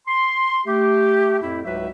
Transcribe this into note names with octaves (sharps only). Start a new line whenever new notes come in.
C6
A3 G4
F2 A2 E4
C#2 G#2 F#3 F#4 B4 E5